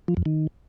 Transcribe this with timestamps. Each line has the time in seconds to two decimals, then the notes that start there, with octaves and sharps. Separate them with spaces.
0.08 F3
0.17 F2
0.26 D#3